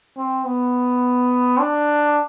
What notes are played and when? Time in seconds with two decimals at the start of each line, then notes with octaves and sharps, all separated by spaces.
0.17 C4
0.45 B3
1.59 D4